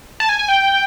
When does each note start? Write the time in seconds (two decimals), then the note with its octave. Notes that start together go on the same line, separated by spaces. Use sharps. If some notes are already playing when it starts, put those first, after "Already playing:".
0.20 A5
0.29 G#5
0.39 G#5
0.48 G5